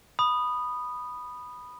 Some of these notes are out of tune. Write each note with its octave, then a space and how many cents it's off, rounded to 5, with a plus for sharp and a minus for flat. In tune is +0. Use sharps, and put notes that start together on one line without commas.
B5 +0 D#6 -15